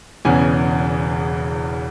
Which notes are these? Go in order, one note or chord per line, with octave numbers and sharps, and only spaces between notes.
E1 E2 C#3 E3 G#5